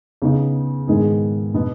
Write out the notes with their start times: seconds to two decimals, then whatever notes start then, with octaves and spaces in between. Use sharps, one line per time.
0.22 C#3 B3 D#4
0.88 G#2 D#3 G#3 B3 G#4
1.54 B2 B3 D#4